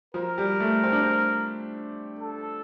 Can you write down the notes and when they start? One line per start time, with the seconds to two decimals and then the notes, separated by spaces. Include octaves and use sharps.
0.14 F3 A#4
0.38 G3
0.60 A3
0.83 C4
0.92 D4
1.02 C4
2.19 A4